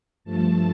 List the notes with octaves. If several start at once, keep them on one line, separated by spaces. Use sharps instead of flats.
G2 F3 A3 A5